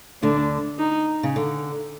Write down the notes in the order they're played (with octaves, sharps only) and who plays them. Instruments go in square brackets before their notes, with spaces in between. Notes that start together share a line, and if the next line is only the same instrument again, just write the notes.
[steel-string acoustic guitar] D2 D3 [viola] D4
[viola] D#4
[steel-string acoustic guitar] C#3
D3